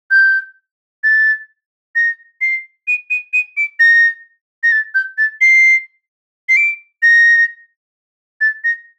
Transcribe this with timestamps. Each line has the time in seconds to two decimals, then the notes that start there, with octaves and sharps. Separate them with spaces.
0.11 G6
1.04 A6
1.96 A#6
2.41 C7
2.88 D#7
3.10 D#7
3.33 D#7
3.57 D7
3.80 A#6
4.63 A#6
4.72 A6
4.95 G6
5.18 A6
5.41 C7
6.49 C7
6.57 D7
7.03 A#6
8.41 A6
8.64 A#6